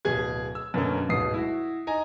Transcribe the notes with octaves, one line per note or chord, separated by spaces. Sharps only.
D1 B2 G#4 G#6
E6
F#2 B2 D3 A#3 C#4
D1 G#2 B2 D#6 C7
E4 F#4
D#4 G#5 A#5